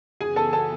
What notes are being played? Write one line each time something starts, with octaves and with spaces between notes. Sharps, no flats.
F#2 C#3 E3 B3 G#4 G#5
A4 A5
A4 A5